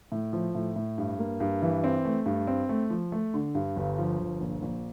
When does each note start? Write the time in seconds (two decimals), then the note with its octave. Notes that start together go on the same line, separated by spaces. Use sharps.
0.12 A2
0.33 F3
0.55 A2
0.76 A2
0.98 G2
1.19 A#3
1.40 G2
1.62 E3
1.84 C4
2.05 A3
2.26 G2
2.47 C4
2.69 A3
2.90 F3
3.12 A3
3.34 D3
3.55 G2
3.76 G1
3.98 F3
4.19 G1
4.40 A#1
4.62 A#1